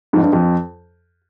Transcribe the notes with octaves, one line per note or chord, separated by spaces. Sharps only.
F2 G#2
G2
F2